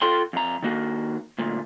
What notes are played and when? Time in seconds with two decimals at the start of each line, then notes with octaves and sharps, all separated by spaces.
0.02 F4 A4 G5 C6
0.33 F2 A#5
0.63 D#3 A#3 F#4
1.38 D2 A#2